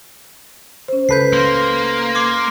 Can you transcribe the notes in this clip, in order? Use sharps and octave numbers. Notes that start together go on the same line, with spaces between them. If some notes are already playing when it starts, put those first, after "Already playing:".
C#4 C5
C#2 A4 B4 G6 B6 C7
A#3 C6
C6 D6 G#6 C7